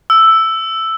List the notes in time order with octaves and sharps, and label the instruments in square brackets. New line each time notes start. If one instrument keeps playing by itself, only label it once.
[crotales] E6